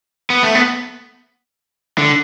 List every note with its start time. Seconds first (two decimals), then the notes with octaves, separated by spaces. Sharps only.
0.30 B3
0.43 A3
0.55 B3
1.98 D3